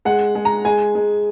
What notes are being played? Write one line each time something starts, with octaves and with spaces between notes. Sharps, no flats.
G#3 F#5
G#3
A#5
G#3 G#5
G#3